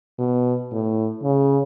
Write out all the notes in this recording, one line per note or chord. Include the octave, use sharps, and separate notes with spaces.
B2
A2
C#3